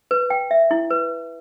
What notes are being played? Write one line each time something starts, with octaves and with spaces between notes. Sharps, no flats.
B4
G5
E5
E4
B4